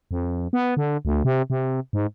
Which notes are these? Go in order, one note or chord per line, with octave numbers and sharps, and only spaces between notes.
F2
B3
D3
D2
C3
C3
G#2